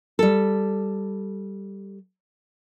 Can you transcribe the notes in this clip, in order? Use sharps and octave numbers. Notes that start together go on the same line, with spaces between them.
G3 A4